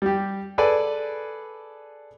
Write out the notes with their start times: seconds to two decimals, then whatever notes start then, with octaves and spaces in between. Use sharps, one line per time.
0.02 G3 G4
0.58 G#4 A4 B4 D5 G#5